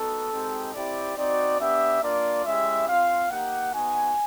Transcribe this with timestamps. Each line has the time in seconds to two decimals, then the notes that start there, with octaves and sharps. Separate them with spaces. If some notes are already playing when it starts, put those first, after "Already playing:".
Already playing: B3 D#4 F#4 A4
0.31 G#3 C4 D#4 G4
0.74 C4 E4 G4 D5
1.16 C4 D#4 F#4 D5
1.59 B3 D4 G4 E5
2.02 A#3 D4 F4 D5
2.45 G#3 C#4 E4 G4 E5
2.87 C4 F4 F5
3.30 A#3 D#4 G4 F#5
3.73 B3 D#4 F#4 G#5